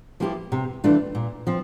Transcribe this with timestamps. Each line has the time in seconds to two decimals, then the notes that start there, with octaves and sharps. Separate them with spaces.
0.20 F3 A#3 E4 G4
0.52 C3
0.84 E3 A3 D4 F4
1.15 A#2
1.47 F3 C4